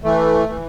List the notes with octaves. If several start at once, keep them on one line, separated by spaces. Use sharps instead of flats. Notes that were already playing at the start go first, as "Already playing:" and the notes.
E3 A3
E3